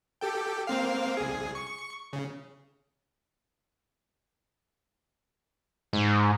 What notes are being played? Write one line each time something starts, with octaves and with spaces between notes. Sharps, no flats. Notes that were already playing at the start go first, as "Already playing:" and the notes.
G4 A4 G5
A#3 C4 F5
C2 G#4
C#6
C#3
G#2